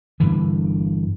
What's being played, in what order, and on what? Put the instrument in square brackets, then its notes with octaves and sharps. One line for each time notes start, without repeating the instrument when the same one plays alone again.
[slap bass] G2 D3 E3